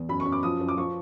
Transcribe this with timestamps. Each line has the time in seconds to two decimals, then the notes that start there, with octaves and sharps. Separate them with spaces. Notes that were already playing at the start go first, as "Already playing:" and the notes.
Already playing: E2
0.09 F#2 B5
0.20 C#6
0.25 F#2
0.32 D6
0.43 F3 D#6
0.60 F#2
0.69 D6
0.77 F3 C#6